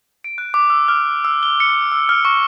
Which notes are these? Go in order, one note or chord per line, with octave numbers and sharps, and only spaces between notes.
D7
F#6
D6
E6
F6
E6
G7
C#7
E6
F6
C#6